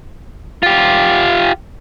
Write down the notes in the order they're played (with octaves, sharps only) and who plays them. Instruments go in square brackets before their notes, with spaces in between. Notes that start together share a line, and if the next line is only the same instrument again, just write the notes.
[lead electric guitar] F4 G4